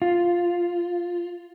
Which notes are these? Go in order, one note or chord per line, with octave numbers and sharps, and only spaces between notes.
F4